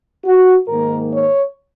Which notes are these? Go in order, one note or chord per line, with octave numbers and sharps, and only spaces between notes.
F#4
G#2 D#3 A#3 A#4
C#5